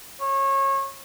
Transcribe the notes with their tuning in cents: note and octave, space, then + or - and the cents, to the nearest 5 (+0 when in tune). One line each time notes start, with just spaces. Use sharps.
C#5 -25